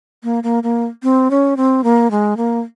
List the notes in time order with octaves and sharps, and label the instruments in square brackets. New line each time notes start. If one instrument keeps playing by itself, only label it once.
[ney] A#3
A#3
A#3
C4
C#4
C4
A#3
G#3
A#3